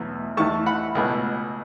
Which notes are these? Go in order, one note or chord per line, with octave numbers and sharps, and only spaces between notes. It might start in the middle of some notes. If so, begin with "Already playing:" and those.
Already playing: E2 B2 F#3 A3
E2 E3 A3 A5 C#6
F#5 B5
C#2 B2 A3